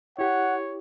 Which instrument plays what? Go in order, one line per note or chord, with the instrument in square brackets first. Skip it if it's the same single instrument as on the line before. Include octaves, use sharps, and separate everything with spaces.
[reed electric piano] E4 G4 [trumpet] C#5 [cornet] F#5